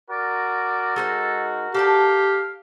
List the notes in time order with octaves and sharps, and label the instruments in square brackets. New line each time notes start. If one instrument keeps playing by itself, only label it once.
[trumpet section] F#4 A#4 [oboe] D5
[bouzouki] G#3 D#4 C5 [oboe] A4
[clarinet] G4 [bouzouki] A4 D5 A5 [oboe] F5